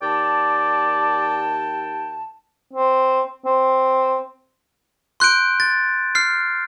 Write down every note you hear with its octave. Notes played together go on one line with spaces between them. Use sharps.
D#2 D5 G5 A5
C4
C4
C6 F#6 G6 D7
A6
F6 C7